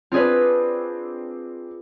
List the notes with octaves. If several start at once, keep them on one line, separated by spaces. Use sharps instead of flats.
C4 D4 F4 G#4 B4